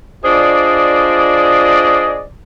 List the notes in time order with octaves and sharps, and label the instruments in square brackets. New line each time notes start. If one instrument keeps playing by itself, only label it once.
[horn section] D4 F4 G#4 C5 D5 D#5